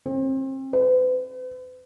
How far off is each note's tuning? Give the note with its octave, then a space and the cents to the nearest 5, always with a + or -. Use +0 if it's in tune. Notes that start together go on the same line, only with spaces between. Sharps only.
C4 +35
B4 +45